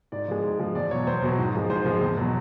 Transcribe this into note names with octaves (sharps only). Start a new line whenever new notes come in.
G#2 D5
F3 G#3
G#2
F3 G#3
E2 D5
B2 F#3 C#5
E2 C5
B2 F#3
G#2
F3 G#3
G#2 C5
F3 G#3
E2
B2 F#3